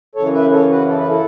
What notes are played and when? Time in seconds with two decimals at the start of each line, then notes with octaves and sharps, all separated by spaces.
0.15 F#2 C#3 E3 A4 C#5
0.34 B4 E5
0.52 A4 C#5
0.70 F#4 B4
0.89 A4
0.98 B4
1.08 E4 A4